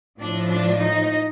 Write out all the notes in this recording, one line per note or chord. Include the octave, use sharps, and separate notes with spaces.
A2 F3 D4
D4
D#4